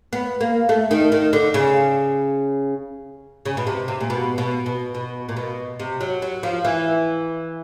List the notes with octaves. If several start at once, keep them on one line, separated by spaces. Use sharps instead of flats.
B3
A#3
A3
D#3
D#3
D3
C#3
C#3
B2
C3
C3
A#2
B2
B2
B2
B2
A#2
B2
C3
F#3
F#3
F3
E3